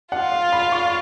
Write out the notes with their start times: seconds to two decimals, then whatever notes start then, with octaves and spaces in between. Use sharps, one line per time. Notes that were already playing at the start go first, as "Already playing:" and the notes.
0.12 F4 F#5
0.32 F5
0.52 B5
0.72 C#6